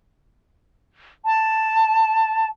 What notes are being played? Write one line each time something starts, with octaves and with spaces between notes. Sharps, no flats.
A5